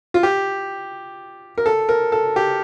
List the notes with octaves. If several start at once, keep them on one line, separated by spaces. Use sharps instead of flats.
F4
G4
A#4
A4
A#4
A4
G4